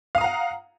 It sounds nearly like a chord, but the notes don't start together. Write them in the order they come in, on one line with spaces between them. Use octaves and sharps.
F5 D#6 A#5 F#5